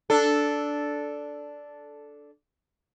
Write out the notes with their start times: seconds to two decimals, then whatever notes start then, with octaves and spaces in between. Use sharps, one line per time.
0.10 D4 A4